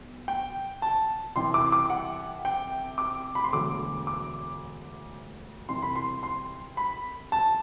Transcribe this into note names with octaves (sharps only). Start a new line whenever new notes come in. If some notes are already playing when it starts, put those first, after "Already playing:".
Already playing: B1
G5
A5
C2 C3 E3 C6
D6
D6
F#5
G5
D6
B5
C6
E1 D2 D3 F#3 D6
D6
C2 C3 E3 C6
B5
C6
C6
B5
A5